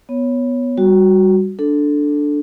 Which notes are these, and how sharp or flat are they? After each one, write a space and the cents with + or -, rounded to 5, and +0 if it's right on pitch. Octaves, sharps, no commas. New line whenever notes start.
B3 +0 C#5 +0
G3 +0 F#4 +0
D4 +0 A4 +0